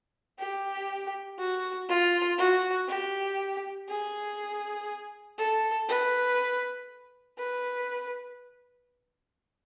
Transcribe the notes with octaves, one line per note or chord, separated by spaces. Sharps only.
G4
F#4
F4
F#4
G4
G#4
A4
B4
B4